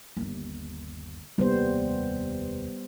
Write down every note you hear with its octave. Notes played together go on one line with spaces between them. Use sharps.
G1 D#2
F1 D#2 G3 B3 C5